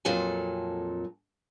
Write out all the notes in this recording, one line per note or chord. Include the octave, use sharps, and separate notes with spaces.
F2 A#2 F#3 A4 G#5